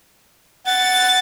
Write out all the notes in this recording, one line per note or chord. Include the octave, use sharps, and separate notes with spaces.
F#5 A6